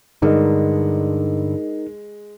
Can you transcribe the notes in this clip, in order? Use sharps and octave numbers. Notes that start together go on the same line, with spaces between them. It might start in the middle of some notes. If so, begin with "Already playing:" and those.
G2 D3 G#3 D#4 A#4 D#5